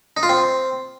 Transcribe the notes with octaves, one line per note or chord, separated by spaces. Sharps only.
D#4
F4
C4